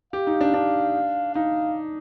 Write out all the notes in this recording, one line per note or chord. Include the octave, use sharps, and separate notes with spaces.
G4 F5
D#4
D4
D4
D#4 F5